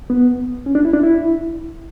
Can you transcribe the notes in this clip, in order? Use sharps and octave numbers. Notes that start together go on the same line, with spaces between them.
B3
C#4
D4
E4
D4
E4